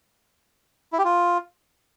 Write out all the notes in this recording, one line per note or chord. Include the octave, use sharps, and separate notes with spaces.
E4
G4
F4